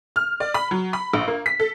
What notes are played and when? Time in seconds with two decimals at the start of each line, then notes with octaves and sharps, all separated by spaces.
0.16 F6
0.40 D5
0.54 B5
0.71 F#3
0.93 B5
1.13 A#1
1.28 A#3
1.46 B6
1.60 A4